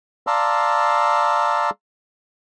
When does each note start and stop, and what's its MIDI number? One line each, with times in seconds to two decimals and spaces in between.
0.27 1.70 74
0.27 1.70 77
0.27 1.70 81
0.27 1.70 82
0.27 1.70 84
0.27 1.70 88